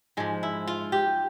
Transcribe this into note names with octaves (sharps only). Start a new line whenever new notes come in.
G#2 F3 G#3
E4
F4
G4